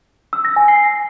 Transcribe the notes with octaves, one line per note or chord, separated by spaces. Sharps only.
E6
A#6
G#5
C7